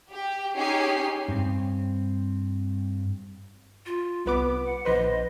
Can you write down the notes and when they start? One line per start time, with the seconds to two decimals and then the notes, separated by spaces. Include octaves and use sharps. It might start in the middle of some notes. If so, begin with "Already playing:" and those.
0.11 G4
0.56 C#4 D#4 G4 G#4 G#5 C7
1.28 G2 C4
3.86 F4
4.26 C2 B3 B4 D6
4.66 F#5
4.85 A#1 B4 C5 D#5